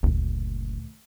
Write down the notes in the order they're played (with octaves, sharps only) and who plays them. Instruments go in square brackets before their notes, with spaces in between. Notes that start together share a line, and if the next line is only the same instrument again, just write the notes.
[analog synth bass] F#1 [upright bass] D2 A#2